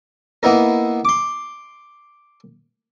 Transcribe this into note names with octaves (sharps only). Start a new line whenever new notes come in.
A#3 B3 D#4 E4 A#4
C6 D6